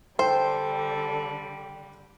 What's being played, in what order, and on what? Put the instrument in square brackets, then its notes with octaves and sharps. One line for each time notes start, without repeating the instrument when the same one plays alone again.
[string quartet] D3 G3 [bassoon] A4 [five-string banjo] C5 [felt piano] G5